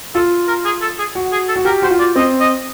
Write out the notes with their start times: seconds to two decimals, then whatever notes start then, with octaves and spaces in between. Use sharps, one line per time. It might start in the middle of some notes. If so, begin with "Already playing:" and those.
0.15 F4 A4
0.48 A#4
0.65 G#4
0.81 A4
0.99 G#4
1.15 F#4
1.32 G#4
1.48 A4
1.56 F#4
1.65 G4 A#4
1.82 F#4 C5
1.90 F4
1.99 D5
2.16 C4 D#5
2.40 D#5